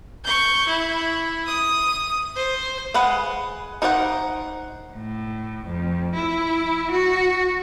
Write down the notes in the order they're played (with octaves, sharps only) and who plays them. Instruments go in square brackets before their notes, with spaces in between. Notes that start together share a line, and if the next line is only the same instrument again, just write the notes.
[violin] C#6 G6
E4
D#6
C5
[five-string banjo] G#3 B4 F#5
D#4 A#4 C5 D5 F#5
[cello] A2
F2
E4
F#4